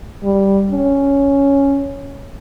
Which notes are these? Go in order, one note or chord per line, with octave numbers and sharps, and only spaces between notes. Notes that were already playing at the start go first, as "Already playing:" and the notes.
G3
C#4